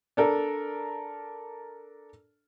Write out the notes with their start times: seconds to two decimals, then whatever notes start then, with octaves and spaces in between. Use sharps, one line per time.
0.17 D4 A4 A#4